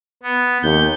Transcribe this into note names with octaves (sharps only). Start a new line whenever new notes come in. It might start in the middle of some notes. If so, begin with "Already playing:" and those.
B3
D#2 G6